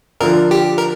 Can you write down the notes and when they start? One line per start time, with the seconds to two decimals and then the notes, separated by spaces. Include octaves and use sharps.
0.21 D3 F3 A#4
0.51 G4
0.78 A#4